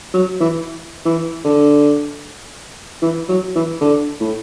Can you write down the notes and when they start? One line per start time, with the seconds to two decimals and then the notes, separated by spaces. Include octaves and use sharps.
0.14 F#3
0.40 E3
1.05 E3
1.45 D3
3.02 E3
3.28 F#3
3.55 E3
3.81 D3
4.20 A2